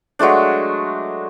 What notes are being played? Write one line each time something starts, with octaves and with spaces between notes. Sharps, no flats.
F#3 G#3 A3 D4